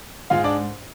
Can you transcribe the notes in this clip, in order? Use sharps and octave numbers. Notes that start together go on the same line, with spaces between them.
G#2 G#3 F4 F5
D4 D5